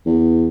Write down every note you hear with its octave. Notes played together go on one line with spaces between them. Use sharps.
E2